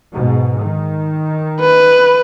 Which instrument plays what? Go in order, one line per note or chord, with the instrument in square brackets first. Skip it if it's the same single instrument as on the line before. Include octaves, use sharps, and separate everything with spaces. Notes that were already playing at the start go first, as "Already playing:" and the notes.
[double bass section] G#2 B2
D#3
[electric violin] B4